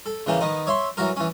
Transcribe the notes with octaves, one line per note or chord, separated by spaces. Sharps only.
A4
C#3 E3 A#3 G4
D#3 B3 D#4
C#5 E5 C6
E3 F#3 F#4 A#4
E3 C#4